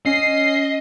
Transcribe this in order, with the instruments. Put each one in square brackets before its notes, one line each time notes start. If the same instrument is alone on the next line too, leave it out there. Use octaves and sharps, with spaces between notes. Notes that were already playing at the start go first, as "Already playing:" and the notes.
[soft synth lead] C#4 [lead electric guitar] D#5 [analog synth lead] C7